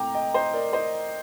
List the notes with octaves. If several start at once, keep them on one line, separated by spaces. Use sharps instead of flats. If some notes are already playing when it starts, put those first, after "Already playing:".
Already playing: A#2 A3 C4 G5 A#5 D6
D#5 G5
C5 D#5
A#4 D5
C5 D#5